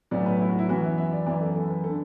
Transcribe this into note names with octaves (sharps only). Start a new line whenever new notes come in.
B1 A2 F#3 B3 D5
B4
E4
F#4
E4
F#2 E3 B3 F#4
E5
E5
D5
F#2 E3 B3 D5
A4
A4
B4
A4
D3